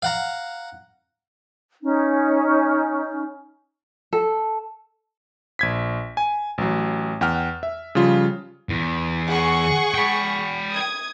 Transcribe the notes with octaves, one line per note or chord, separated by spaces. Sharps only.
F5 F#5 A#5
C#4 D#4
A4
A#1 G#6 B6
G#5
A1 F#3
E2 F#5 G5 F6
E5
C#3 F3 G3 F4
E2
G#4 F#5 C#6
G5 B5
D#6 G#6